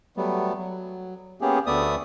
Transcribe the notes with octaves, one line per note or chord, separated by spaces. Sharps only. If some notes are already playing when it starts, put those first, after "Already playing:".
F#3 G3 A3 B3
F#3
A#3 B3 C#4 G4 G#4
D2 A3 B3 D5 E5 D#6